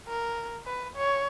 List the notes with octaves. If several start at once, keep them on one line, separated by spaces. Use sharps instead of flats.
A#4
B4
C#5